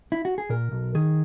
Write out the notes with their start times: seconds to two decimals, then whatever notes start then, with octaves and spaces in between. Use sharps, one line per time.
0.12 E4
0.25 F#4
0.38 G#4
0.49 A#2 A#4
0.72 B1
0.95 D#3 G#4